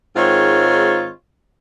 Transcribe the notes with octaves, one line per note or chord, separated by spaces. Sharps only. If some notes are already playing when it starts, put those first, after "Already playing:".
G#2 D#3 G#3 C4 F4 C#5